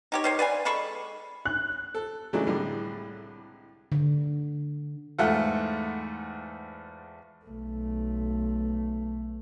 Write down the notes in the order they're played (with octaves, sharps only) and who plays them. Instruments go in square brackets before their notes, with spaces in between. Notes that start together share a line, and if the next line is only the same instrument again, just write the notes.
[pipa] D#4 G4 C#5
D#3 C5 C#5
B4 D5 F5 G#5
G#3 A4 B5 C#6
[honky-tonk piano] F#6
[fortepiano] A4
C#3 E3 F#3 G#3 A3 D4
C2 A2 D3 G3 G#3
[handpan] D3
[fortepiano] E2 G#2 A3 F4 F#5
[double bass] B1 A3